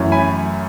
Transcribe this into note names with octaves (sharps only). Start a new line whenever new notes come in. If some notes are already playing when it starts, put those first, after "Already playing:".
Already playing: F#2 E3 A3 C#4
G#5 B5